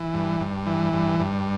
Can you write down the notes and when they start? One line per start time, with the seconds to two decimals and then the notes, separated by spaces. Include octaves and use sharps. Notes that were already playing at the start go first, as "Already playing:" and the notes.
Already playing: E3
0.14 G2
0.40 G2
0.66 E3
0.93 G2
1.20 G2